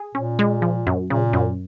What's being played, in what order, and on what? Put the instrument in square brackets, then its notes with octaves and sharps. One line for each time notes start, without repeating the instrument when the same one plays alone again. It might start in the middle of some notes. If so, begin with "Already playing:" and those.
Already playing: [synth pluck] G#4
[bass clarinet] A#2 [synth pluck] C#4
[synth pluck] G#3
F3
F#2
[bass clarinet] A#2 [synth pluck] C#3
[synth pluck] F#2